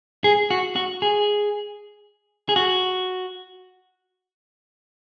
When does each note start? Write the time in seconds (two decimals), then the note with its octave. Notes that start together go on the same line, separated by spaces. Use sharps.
0.24 G#4
0.51 F#4
0.76 F#4
1.02 G#4
2.49 G#4
2.56 F#4